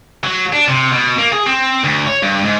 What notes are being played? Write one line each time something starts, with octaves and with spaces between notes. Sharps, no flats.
F#3
D4
C3
B2
A#3
G#4
C4
D2
C#5
G2
G#2